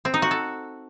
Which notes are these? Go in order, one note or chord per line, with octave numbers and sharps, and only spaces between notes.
C4
D#4
F#4
A4